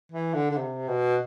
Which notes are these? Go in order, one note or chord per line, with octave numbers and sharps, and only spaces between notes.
E3
D3
D3
C3
B2